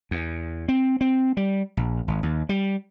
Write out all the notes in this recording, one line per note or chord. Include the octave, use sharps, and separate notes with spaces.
E2
C4
C4
G3
A#1
G#1
D#2
G3